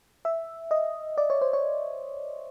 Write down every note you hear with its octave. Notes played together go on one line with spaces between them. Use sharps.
E5
D#5
D5
C#5
C5
C#5